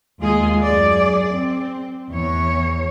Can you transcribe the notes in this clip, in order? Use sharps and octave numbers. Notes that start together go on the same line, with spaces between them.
D#2 G#3 F4 G#4
F#2 G#4 D5
C4
E2 C#5